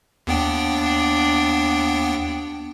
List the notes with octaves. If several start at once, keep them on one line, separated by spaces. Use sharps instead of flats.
D#2 B3 D4 G5